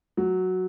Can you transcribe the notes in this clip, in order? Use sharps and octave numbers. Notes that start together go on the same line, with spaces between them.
F#3